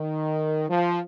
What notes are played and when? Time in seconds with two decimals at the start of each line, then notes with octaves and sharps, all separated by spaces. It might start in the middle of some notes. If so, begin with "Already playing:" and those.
Already playing: D#3
0.70 F3